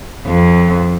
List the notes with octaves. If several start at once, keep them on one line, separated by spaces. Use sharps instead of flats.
F2